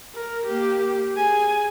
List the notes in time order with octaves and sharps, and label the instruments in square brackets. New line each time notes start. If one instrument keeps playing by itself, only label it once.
[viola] A#4
A#3 G4
G#4 G#5